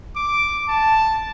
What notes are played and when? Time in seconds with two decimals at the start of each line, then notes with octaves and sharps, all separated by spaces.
0.16 D6
0.69 A5